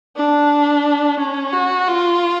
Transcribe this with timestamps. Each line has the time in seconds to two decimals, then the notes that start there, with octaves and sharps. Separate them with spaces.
0.16 D4
1.20 C#4
1.53 F#4
1.88 F4